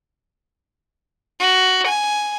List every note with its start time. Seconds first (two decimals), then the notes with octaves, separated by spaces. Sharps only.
1.40 F#4
1.87 G#5